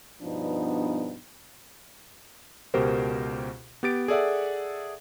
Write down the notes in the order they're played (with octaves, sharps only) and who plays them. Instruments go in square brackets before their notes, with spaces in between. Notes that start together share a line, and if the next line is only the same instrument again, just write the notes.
[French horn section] G2 B2 F3 B3 D4 D#4
[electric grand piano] C#2 B2 G4 A#4 C5
B3 G4 A6 D7
G#4 A4 D5 E5 F#5